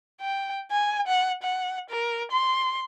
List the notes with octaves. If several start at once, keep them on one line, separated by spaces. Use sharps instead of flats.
G5
G#5
F#5
F#5
A#4
C6